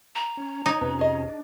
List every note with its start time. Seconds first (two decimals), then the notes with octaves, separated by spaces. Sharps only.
0.15 A#5
0.37 C#4
0.66 D#4 C#5
0.81 F2 C3 B3 C#4 B4
0.99 G#4 D#5
1.28 D4